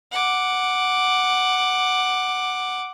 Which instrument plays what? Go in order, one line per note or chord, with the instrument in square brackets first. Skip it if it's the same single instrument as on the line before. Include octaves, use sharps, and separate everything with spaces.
[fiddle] F#5 D6